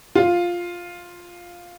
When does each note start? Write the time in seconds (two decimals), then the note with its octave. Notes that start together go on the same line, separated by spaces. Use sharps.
0.15 F4